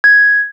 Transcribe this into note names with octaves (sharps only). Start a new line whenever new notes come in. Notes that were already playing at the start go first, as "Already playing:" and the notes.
G#6